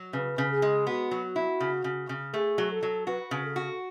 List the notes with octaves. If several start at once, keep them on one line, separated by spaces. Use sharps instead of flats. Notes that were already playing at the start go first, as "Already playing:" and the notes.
Already playing: F#3
C#3 B4
C#3
G#4
G#3
B3 F#4
F#3
E4
C#3
C#3
C#3
A3 G#4
F#3
A4
F#3
F#4 B4
C#3
A4
F#4